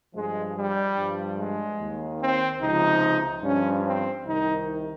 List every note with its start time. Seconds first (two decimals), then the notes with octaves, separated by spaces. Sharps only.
0.15 G2 F3 G#3
0.56 G3
0.97 G2 F3
1.38 G#3
1.79 D#2 D#3
2.21 C4
2.62 C#2 C3 F3 D#4
3.43 G2 F3 C#4
3.85 C4
4.26 C2 C3 D#3 D#4